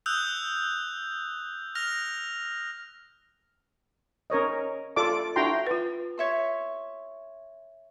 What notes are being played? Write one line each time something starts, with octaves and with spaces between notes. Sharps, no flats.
D#6 E6 F#6 G6 F7
F6 A#6 F7
C#4 A#4 C#5 D#5
F4 A4 D5 A5 D6
D4 E4 F#4 G5 A#5 C6
F4 B4
C#5 E5 C6